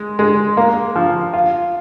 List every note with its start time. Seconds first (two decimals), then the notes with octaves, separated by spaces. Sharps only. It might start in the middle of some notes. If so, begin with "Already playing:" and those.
Already playing: G#3
0.19 G#3
0.57 A#3
0.96 F3
1.34 F4